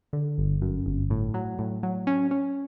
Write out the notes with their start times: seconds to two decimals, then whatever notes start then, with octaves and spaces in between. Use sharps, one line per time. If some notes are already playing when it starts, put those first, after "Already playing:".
0.13 D3
0.38 G1
0.61 F#2
0.86 G1
1.10 A2
1.34 F#3
1.59 A2
1.83 F#3
2.07 C#4
2.31 C#4